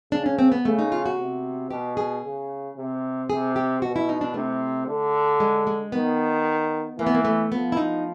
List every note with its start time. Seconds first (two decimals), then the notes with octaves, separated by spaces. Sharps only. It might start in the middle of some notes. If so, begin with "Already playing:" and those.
0.12 C#3 D4
0.26 C#4
0.39 C4
0.52 B3
0.65 C#3 A3
0.79 D#4
0.92 F4
1.06 F#4
1.18 C3
1.71 B2 G4
1.97 G#4
2.24 C#3
2.77 C3
3.30 C3 G#4
3.56 G4
3.82 B2 F#4
3.96 E4
4.09 D#4
4.21 D4
4.34 C3 A3
4.87 D3
5.40 G#3
5.67 G#3
5.92 D#3 B3
6.99 E3 A#3
7.06 B3
7.14 A#3
7.25 A3
7.51 F3 B3
7.72 E4
7.77 D#4